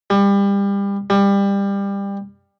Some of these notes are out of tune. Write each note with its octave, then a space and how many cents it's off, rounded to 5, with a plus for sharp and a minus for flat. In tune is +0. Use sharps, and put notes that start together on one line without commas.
G3 +30
G3 +25